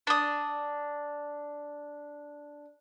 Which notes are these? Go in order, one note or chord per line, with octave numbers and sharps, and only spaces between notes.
D4 D#6